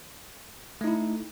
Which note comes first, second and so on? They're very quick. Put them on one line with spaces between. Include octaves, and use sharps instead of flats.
A3 D#4 E4